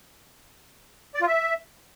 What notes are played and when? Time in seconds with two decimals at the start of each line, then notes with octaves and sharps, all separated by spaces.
1.15 D5
1.21 F4
1.27 E5